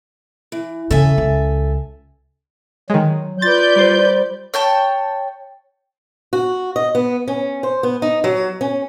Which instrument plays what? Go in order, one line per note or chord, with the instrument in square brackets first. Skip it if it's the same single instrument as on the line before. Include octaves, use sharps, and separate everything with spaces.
[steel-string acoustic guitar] E3
[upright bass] E2 C#3 [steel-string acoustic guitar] A4 E5 G#5
[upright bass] C#2
[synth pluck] D#3 G#3 [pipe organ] F#3
[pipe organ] F4 [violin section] B4 D5 G6 [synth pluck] A6
[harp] G3 C5
[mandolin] C#5 G5 A5
[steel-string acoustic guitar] F#4
D#5
B3
C#4
C5
B3
D#4
F#3
C#4